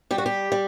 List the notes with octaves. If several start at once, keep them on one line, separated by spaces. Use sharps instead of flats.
G3 G4
F#4
G4
G3